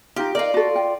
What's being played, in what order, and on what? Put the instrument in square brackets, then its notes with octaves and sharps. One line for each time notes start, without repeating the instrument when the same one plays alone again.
[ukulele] D#4 F4 [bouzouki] G4
[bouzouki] F4 D5 [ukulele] A#4 D#5 F5
[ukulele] F#4 A4
G5